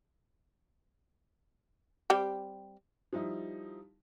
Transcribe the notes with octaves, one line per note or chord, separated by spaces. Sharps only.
G3 C4 G4
F3 G3 D#4 E4